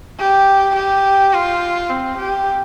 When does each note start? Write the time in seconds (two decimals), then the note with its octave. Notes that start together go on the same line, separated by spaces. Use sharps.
0.19 G4
0.76 G4
1.33 F4
1.90 C4
2.18 G4